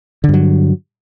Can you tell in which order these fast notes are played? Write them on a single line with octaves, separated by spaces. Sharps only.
D3 G2 F#3